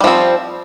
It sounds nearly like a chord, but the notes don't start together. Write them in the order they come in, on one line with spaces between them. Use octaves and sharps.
G3 F3 C4